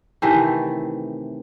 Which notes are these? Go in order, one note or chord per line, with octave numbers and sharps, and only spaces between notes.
C3 D#3 E3 A3